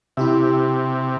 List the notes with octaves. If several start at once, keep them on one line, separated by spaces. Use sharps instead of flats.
C3 E4 G4 E5